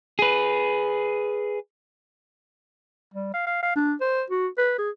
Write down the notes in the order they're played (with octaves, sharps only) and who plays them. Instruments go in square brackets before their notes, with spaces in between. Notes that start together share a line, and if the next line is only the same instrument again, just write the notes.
[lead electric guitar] G#4 B4
[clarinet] G3
F5
F5
F5
D4
C5
F#4
B4
G#4